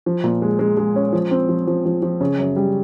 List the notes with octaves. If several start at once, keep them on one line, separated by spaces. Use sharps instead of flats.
F3
A#2
G#3
G#3
G#3
C#4
F3
C4
F3
F3
F3
F3
C#3
F#2
G3